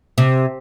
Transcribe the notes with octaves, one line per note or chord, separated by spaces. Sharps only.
C3